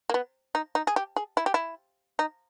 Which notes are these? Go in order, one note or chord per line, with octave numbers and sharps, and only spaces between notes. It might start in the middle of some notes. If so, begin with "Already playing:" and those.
A#3
B3
D#4
D#4
G#4
G4
G#4
E4
G4
E4
D#4